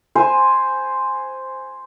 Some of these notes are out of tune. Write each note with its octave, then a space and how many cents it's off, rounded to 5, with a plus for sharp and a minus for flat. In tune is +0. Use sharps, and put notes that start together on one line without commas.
C5 +0 G#5 +0